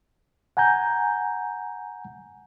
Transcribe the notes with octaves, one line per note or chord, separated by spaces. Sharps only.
F#5 G#5 A#5 G6